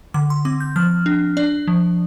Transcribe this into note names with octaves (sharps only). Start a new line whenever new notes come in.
D3 D6
C6
C4 D6
G6
F3 F6
D4
D4 D5
F3